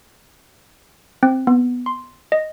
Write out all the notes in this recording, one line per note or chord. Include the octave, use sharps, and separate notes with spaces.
C4
B3
C6
D#5